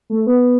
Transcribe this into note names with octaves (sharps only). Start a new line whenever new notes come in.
A3
B3